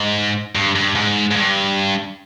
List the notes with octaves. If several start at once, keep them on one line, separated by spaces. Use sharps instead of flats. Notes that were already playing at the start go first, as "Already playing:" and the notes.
Already playing: G#2
G2
G2
G#2
G#2
G2